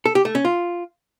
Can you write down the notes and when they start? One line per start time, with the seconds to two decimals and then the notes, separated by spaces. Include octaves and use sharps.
0.06 A4
0.15 G4
0.25 A3
0.35 C#4
0.45 F4